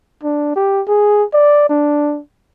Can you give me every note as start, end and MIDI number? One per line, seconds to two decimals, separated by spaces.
0.23 0.53 62
0.56 0.82 67
0.87 1.24 68
1.33 1.66 74
1.69 2.20 62